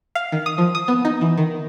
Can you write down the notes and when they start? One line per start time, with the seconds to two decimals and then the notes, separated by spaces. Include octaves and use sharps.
0.15 F5
0.32 D#3
0.46 D#6
0.58 F3
0.75 D#6
0.88 B3
1.05 D#4
1.21 E3
1.38 D#3